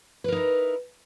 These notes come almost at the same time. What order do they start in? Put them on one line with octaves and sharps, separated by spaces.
B4 A#4 D#4 E4